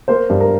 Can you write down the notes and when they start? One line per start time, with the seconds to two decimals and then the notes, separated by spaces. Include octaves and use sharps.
0.08 A#3 C5
0.30 G2
0.40 A#4